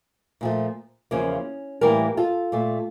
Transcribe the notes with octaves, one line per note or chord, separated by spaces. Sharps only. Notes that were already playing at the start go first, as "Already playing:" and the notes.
A#2 F3 A3
E2 C#3 F3 A#3 C#4
A2 E3 G3 A#3 G4 A#4
F4 A4
A#2 A3